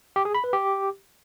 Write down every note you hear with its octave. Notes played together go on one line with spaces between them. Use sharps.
G4
G#4
B5
B4
G4